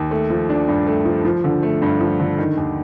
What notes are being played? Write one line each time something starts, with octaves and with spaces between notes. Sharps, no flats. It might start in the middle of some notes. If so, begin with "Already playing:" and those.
Already playing: D#2
A3
F3
D4
G2
A3
F3
F3
D3
A3
G2
F3
D3
D#3
D#2